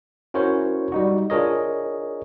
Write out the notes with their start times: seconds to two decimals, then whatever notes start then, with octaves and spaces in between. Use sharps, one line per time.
0.34 C#4 E4 F#4 A#4 C5 C#5
0.92 G3 D#4 F#4
1.30 D4 F4 G#4 A#4 C#5 D#5